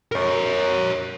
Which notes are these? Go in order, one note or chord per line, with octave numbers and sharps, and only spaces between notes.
A#4 C#5